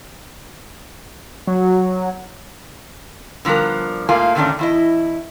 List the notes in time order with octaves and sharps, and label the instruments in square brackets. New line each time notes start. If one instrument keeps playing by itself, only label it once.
[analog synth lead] F#3
[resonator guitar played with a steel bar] D3 F3 G3 B3 A#4
G#2 A3 A#3 F4 G#5
A#2 D3 D#3 A3 C#4 D4
E2 E4 D#5